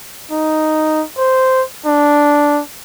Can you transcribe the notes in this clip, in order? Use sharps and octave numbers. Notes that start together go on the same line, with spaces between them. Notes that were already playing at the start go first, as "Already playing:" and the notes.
D#4
C5
D4